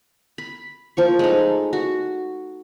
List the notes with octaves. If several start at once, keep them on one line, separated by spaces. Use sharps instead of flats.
B5
F3 A#3 C#6
G#3 A3 D#4
F#4